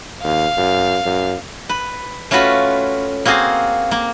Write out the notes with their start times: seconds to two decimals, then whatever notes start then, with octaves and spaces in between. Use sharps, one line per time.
0.24 D#2 F5
0.57 F#2
1.06 F#2
1.69 B4
2.31 A3 C#4 F4 F#4 B4
3.25 A#3 C4 F#4 G#4 F5
3.91 A#3